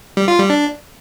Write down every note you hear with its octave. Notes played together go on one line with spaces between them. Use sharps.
G3
F4
G3
D4